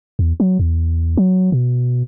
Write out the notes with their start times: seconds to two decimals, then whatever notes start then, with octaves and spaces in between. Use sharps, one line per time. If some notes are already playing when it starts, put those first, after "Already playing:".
0.19 E2
0.40 F#3
0.59 E2
1.17 F#3
1.52 B2